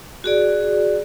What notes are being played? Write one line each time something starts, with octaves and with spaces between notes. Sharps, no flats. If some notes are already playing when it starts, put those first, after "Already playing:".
F#4 G#4 D5